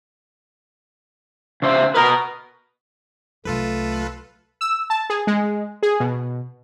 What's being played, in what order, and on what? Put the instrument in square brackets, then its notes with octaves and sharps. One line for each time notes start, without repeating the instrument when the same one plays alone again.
[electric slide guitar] C#3 C5 E5
[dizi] A#4 [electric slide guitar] B4 D#5
[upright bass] C2 F#3 [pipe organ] A3 [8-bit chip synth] F4 A4 B4
[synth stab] E6
A5
G#4
G#3
G#4
B2